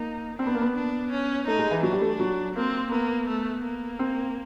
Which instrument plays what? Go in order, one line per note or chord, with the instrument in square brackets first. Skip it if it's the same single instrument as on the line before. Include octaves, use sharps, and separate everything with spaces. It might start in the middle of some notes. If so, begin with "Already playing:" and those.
Already playing: [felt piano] A#3 [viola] D#4
[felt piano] C4 [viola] D4
[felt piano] B3
A#3
B3
[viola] D4
C#4
[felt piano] A3 [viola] D#4
[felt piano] G#3
E3
[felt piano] F#3 [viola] D4
[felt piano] G3
A3
F#3
[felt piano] A#3 [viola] C4
[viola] A#3 [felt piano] B3
[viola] A3
A#3
[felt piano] C4